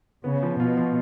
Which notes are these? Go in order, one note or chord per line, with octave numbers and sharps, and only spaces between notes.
C#3 B3
F3
B2 F4
F3